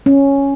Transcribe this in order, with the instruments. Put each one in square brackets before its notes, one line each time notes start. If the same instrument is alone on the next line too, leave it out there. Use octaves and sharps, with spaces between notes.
[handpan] C#4